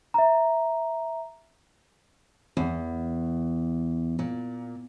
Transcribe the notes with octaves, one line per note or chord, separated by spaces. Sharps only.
E5 A#5
E2
A#2